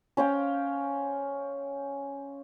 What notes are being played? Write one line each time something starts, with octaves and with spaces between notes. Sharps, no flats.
C#4 C5 F5 G5